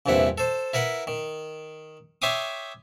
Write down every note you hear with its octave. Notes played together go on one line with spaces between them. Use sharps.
A#1 E2 G2 C3 E4 F#5
A4 C5
E4 A#4 B4 F#5
D#3
C#5 E5 G5 C6 D6 D#6